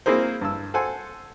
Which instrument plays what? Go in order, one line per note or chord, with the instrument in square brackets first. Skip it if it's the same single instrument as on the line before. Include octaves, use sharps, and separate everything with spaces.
[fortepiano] A#3 C4 E4 G#4 A#4 C5
G2 E6
A4 C5 F#5 G#5 C6